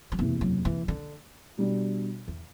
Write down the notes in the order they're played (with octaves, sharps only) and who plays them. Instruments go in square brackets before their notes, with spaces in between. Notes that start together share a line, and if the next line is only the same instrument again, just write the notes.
[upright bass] F#3
[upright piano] F#1 E2 C3 [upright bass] E3
[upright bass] F#3
E3
D3
[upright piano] B2 G3 D4
[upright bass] E2